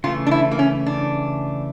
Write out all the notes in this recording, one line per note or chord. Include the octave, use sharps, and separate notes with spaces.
C#3 E3 A3 F4
D4
E4
A#3
C#4
D4